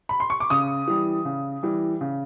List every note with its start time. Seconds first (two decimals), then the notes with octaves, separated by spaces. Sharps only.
0.09 B5
0.20 C6
0.30 C#6
0.40 D6
0.50 C#3 D#6
0.88 E3 G3
1.25 C#3
1.63 E3 G3
2.01 C#3